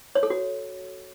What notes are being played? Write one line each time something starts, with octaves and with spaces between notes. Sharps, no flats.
C#5
A4
F#4